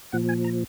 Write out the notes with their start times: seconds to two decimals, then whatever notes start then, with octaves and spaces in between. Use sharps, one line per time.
0.12 A#2 F3 F#5
0.29 G#5
0.44 A#5